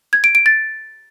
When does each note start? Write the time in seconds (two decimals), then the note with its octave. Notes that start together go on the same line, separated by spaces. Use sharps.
0.13 G#6
0.24 D7
0.35 D7
0.46 A6